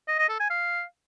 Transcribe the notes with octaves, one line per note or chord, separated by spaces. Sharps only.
D#5
D#5
A4
G#5
F5